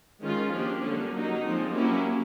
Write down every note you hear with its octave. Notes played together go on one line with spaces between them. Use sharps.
D#3 G#3 C#4 F4
F3 A#3 D4 G4
D3 G3 A#3 C#4
F#3 A#3 D#4
F3 G#3 C4
F#3 A#3 C#4 E4 G4